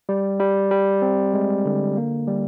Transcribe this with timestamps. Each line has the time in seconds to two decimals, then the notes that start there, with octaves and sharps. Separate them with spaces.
0.09 G3
0.40 G3
0.71 G3
1.02 C4
1.34 G#3
1.65 D3
1.97 A#3
2.28 G3